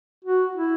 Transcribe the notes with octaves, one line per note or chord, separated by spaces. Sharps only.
F#4
E4